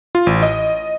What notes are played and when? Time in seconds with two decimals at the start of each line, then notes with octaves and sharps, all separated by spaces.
0.15 F4
0.27 A1
0.43 D#5